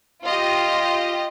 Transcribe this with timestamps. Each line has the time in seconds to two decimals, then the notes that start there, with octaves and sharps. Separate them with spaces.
0.25 F4 G4 D#5